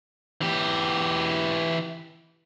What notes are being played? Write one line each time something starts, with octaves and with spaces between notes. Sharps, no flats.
E3 G4